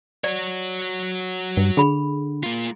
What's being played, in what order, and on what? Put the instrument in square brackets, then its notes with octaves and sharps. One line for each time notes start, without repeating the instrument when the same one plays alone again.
[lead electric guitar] F#4 C#5 [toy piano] D5
[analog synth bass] G2
[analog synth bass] D3 [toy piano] G#4 B5
[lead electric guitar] A#3 F4